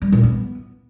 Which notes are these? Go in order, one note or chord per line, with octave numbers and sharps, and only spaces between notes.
G3
A#2
B3